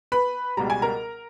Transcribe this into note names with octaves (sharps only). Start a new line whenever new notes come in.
B4 B5
C#2 B2 G3 A#5
G#5
A#4 A#5